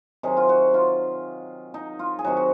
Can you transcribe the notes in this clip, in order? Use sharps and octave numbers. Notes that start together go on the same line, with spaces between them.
C3 D#3 F#3 G#4
F4
F#4
F4
D#4
F4
G#4
C3 D#3 F#3 F#4
F#4